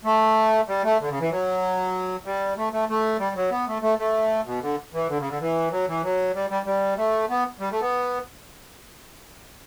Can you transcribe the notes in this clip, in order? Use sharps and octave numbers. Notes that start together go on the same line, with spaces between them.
A3
G3
A3
D3
C#3
E3
F#3
G3
A3
A3
A3
G3
F#3
B3
A3
A3
A3
B2
D3
E3
D3
C#3
D3
E3
F#3
E3
F#3
G3
G3
G3
A3
B3
G3
A3
B3